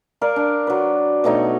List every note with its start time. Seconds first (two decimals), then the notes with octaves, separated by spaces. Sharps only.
0.21 A#4 D5 F5
0.36 D4
0.67 F#3 B4
1.24 B2 A3 D#4 C#5